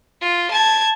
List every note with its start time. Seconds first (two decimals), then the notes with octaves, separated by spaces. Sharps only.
0.21 F4
0.51 A5 G#6